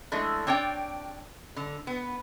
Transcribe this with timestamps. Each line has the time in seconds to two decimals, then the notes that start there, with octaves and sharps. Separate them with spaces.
0.12 E3 G#3 A3 D4
0.47 C4 D4 C#5 D5 G5
1.56 D3
1.87 B3